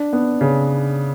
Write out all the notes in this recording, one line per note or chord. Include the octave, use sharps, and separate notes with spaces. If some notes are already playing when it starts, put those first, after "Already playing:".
Already playing: D4
B3
C#3